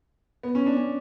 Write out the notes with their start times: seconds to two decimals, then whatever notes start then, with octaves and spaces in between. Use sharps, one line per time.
0.43 B3
0.55 C#4
0.66 D4
0.76 C#4